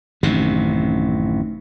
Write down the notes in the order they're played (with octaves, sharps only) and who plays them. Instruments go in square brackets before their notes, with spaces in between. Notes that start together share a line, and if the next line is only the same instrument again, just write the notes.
[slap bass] A1 F#2 C3 D#3